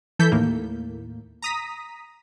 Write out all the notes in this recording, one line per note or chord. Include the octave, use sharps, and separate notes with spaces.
E3 A4 G6 B6
D#2 A2 A#3
A#5 D#6 B6